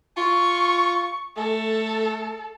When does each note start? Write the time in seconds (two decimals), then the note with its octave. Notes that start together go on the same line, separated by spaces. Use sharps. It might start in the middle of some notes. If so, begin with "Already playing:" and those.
0.17 F4 C#6
1.37 A3 A4